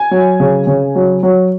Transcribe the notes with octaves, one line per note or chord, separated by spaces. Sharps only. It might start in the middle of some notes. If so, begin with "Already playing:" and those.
Already playing: G#5
F#3
C#3
C#3
F#3
F#3